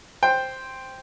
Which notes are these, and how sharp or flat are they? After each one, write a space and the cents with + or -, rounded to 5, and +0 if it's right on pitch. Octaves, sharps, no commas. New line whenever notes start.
C5 +0 G5 +5